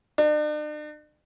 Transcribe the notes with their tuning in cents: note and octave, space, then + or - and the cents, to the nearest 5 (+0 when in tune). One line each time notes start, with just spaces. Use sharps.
D4 +45